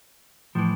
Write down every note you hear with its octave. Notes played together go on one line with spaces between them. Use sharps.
A2 E3 F3